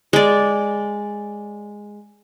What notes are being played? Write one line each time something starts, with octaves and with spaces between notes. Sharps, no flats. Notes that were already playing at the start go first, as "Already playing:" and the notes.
G#3 D5